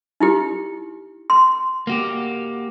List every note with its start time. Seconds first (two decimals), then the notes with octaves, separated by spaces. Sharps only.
0.20 D#4 E4 G4
1.30 C6
1.87 A#3 F#4 G4